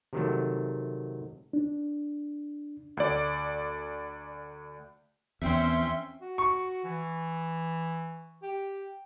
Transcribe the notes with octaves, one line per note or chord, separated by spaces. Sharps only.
C3 D#3 F#3 A3
D4
D2 D5
E2 C4 C#4 E5 C6
F#4
C#6
E3
G4